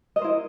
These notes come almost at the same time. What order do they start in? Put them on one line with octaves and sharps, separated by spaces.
D#5 A#4 C5 E4